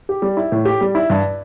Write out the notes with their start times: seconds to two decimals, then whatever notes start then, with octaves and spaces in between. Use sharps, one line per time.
0.09 G4
0.22 G3
0.37 E4
0.52 A2
0.65 G4
0.81 G3
0.95 E4
1.10 G2